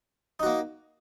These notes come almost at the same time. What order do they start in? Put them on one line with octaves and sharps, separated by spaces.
D#4 F#4 A#3